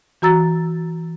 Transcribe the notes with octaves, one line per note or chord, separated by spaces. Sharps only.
E3 F#4 A#5 E6 A6